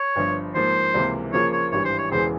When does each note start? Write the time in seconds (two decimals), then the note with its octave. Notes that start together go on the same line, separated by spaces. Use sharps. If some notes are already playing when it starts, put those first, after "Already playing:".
Already playing: C#5
0.16 G1 G2 F3
0.54 G#2 F3 A#3 C5
0.94 C#2 C3 E3 A#3
1.33 C#3 F3 A#3 F4 A#4 C#5
1.53 C#5
1.71 G#1 G2 E3 G3 C#5
1.85 C5
1.98 C#5
2.11 E1 E2 C#3 E3 G#3 C5